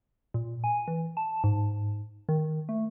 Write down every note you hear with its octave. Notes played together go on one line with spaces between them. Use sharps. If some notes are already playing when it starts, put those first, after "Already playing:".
A#2
G#5
E3
A5
G#2
D#3
A3